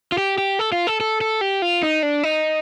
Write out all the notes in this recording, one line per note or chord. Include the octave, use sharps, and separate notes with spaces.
F4
G4
G4
A4
F4
A4
A4
A4
G4
F4
D#4
D4
D#4